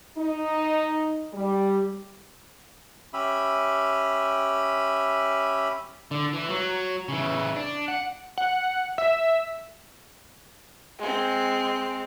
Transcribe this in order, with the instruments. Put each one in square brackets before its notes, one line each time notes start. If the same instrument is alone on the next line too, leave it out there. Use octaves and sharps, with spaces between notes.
[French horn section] D#4
G3
[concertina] C#4 G4 E5 B5
[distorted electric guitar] D3
E3
F#3
C#3 E3
D4
F#5
[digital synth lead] F#5
E5
[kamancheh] G#3 C4